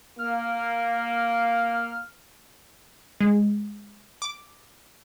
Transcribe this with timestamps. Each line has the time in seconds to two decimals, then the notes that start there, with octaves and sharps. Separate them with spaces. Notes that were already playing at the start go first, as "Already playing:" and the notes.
0.19 A#3 F6
3.21 G#3
4.22 D6